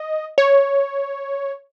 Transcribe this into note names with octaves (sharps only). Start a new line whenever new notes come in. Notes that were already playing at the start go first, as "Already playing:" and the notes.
Already playing: D#5
C#5